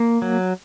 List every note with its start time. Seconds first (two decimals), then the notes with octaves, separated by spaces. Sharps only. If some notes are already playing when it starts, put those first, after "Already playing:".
Already playing: A#3
0.22 F#3